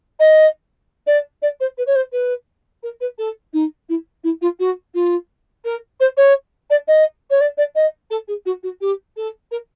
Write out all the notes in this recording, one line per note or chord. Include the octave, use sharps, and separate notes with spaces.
D#5
D5
D5
C5
B4
C#5
C5
B4
A#4
B4
A4
D#4
E4
E4
F4
F#4
F4
A#4
C5
C#5
D5
D#5
C#5
D5
D5
D#5
A4
G#4
F#4
F#4
G4
A4
A#4